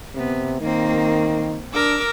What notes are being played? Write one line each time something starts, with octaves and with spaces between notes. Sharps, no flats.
C3 B3
D#3 A#3 C4
D4 A#4 D6 E6